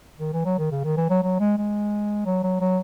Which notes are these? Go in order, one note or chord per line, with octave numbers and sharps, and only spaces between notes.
D#3
E3
F#3
D#3
C#3
D#3
E3
F#3
F#3
G#3
G#3
F#3
F#3
F#3